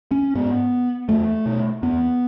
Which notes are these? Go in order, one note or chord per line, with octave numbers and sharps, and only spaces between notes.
C#4
G#2 B3
E2 A3
B2
E2 B3